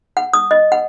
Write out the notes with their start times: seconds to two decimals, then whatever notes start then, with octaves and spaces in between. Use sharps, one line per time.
0.17 F#5
0.33 D#6
0.51 D#5
0.72 F#5